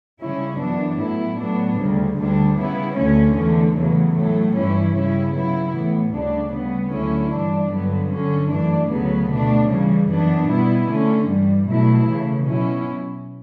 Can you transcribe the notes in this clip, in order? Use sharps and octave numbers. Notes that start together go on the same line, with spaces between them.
C#3 G3 C#4 E4
F#2 E3 B3 D4
A2 F#3 B3 E4
A2 F#3 B3 D4
D2 C#3 G3
D2 D3 G3 D4
C#3 G3 B3 E4
D2 D3 A3 C#4
E2 D3 A3
E2 C#3 F#3 A3
A2 F#3 A3
G2 E3 G3 C#4 E4
C#3 G3 C#4 E4
C#3 F#3 B3 E4
A2 E3 B3
D2 C#3 G3 D4
C#3 G3 B3
D2 D3 F#3 C#4 E4
G2 E3 G3 D4
G2 D3 F#3 B3
D3 F#3 C#4
F#2 E3 A3 D4
D2 C#3 F#3 B3
B2 A3 D4
C#3 E3 G3
F#2 E3 B3 D4
B2 G3 B3 E4
D3 A3 C#4
G2 E3 G3
B2 F#3 A3 E4
C#3 E3 A3
B2 F#3 C#4 E4